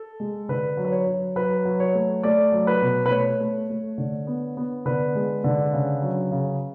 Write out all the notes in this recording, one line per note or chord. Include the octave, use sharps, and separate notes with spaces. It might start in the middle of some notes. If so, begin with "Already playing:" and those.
Already playing: A4
G#3
D3 B4
F#3
B4
C#5
F#3
F#3 B4
F#3
C#5
A3
A3 D5
F#3
B4
B2
B4
A3 C#5
A3
A3
D3
B3
B3
D3 B4
G#3
D3
C#3
F#3
C#3